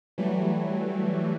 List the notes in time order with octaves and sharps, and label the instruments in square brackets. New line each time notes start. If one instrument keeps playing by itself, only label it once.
[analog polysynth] E3 F#3 G3 A3